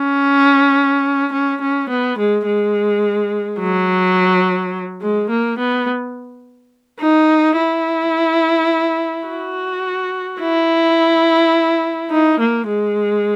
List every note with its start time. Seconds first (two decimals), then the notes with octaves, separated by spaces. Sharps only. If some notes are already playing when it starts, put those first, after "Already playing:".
Already playing: C#4
1.33 C#4
1.61 C#4
1.89 B3
2.18 G#3
2.46 G#3
3.60 F#3
5.02 G#3
5.30 A#3
5.59 B3
7.00 D#4
7.57 E4
9.27 F#4
10.40 E4
12.11 D#4
12.40 A#3
12.68 G#3